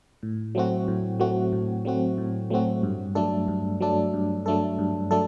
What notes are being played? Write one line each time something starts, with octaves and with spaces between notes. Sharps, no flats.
A2
F#3 A3 C4 F#4
A2
F#3 A3 C4 F#4
A2
F#3 A3 C4 F#4
A2
F#3 A3 C4 F#4
G2
F#3 A3 D4 A4
G2
F#3 A3 D4 A4
G2
F#3 A3 D4 A4
G2
F#3 A3 D4 A4